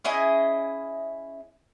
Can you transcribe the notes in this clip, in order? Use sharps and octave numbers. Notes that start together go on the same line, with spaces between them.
C#4 E4 G#4 D#5